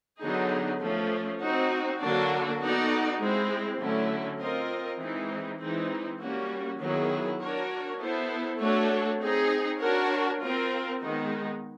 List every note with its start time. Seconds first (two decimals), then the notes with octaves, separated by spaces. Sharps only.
0.21 D3 F#3 B3 D#4 G#4
0.81 F3 A3 C#4
1.41 C4 D#4 F#4
2.01 D3 F#3 A#3 D4 F#4
2.61 B3 D#4 F#4 A4 D5
3.21 G#3 C4 E4
3.80 D3 F#3 A3 C#4 E4
4.40 C4 F4 A#4 D#5
5.00 E3 G#3 C4 D#4
5.60 E3 G#3 C4 D#4
6.20 G3 A#3 C#4 F#4
6.80 D#3 F#3 B3 E4 G#4
7.39 D4 F#4 A#4 C#5
7.99 B3 E4 A4 C5
8.60 A3 D4 F#4 A4 C#5
9.20 C4 D#4 G#4
9.80 D4 F#4 A#4 C#5
10.40 C4 F4 A#4
11.00 D#3 G#3 B3 D#4